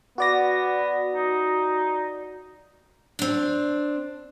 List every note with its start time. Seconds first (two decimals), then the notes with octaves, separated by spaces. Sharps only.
0.18 B3 F#4 D5 A#6
1.15 D#4
3.19 C4 D4